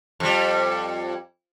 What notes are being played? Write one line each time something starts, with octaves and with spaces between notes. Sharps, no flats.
F2 G3